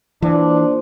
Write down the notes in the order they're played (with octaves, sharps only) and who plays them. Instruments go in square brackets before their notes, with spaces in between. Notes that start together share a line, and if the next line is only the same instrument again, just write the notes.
[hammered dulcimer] A#2 F3 [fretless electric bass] E3 [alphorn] D4